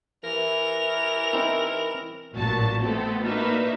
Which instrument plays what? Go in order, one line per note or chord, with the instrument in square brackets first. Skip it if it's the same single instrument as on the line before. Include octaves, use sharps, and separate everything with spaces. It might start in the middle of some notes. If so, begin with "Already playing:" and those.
[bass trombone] E3 [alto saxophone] A#4 [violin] F7
[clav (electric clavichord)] C4 D#4 E4
[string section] A1 A#2 F#3 F#4 A5
A3 B3 C4 A4
A#3 D4 D#4 F#4 B4 E5